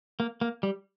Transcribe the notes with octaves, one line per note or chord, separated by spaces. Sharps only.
A#3
A#3
G3